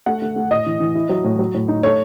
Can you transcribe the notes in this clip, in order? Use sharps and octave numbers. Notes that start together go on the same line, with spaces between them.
A3 F#5
A3
A3
A2 D#5
E3
E3
E4
F#3
A2
F#3
A2
D#4
A3 C#5